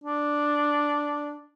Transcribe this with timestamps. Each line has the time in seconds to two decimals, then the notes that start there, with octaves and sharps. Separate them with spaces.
0.04 D4